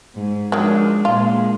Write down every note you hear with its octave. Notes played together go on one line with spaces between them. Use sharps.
G#2
D#3 F3 F#3 G#3 D4
A#2 G#3 F4